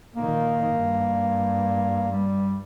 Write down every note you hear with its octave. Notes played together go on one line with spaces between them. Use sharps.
A#2 D#3 A#3
G2
G3